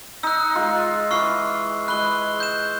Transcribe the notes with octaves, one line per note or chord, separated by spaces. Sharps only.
D#4 E6 F#6
G#3 F4
E3 F4 C#6 F6 C7
G#3 B4 F#6 G7
G6 E7